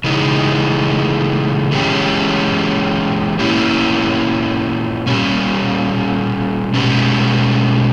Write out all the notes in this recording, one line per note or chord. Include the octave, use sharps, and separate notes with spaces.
C#3 E3 G#3 D#4
E3 G#3 C#4 G4
A#2 A#3 C#4 E4 G4
A#2 G3 C#4
B2 G#3 C#4 G4 B4